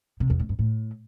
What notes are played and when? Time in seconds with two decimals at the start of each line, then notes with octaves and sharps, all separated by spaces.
0.20 C3
0.30 E2
0.40 A2
0.49 G2
0.59 A2